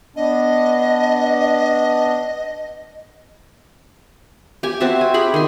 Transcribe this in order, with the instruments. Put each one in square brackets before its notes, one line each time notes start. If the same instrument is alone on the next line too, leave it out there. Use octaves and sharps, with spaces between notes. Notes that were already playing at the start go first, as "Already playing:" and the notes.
[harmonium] B3 D4 [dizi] D#5
[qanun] G4 G#5
C4 F#4 E5 A5
G#5
G4 G#4 B5
D#3 C6